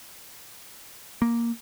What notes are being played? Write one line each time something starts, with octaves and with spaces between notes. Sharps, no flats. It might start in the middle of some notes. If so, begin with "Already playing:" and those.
A#3